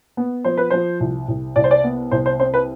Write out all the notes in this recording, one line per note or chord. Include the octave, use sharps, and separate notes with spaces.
B3
F3 C5
B4
F3 C5
C2
C2
C2 D5
C5
D5
B3
C2 C5
C5
C4 C5
B4